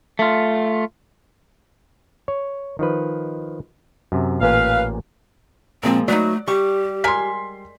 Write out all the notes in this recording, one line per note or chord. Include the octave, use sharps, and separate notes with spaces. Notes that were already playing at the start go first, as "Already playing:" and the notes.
A3 F4
C#5
D#3 F3 B4
F#2 C3
A1 A#2 B4 F5 G#5
A#2 F3 G#3 A#3 C4
F#3 A3 B3 D#4 D5
G3 G4 C#6
G#3 A#4 G#5 C6 B6